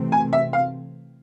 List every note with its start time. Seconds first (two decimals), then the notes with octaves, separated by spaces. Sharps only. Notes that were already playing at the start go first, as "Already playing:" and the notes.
Already playing: C3 E3 A3 C4
0.12 G#5
0.33 E5
0.53 F5